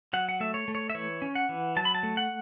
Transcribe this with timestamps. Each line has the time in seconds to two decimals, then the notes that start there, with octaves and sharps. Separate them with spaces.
0.13 F#3 F#5
0.29 F#5
0.40 A3 E5
0.54 C#5
0.68 A3
0.75 C#5
0.90 E5
0.95 E3 C#5
1.22 C#4
1.35 F#5
1.49 E3
1.76 F#3 A5
1.85 B5
1.95 A5
2.03 A3
2.17 F#5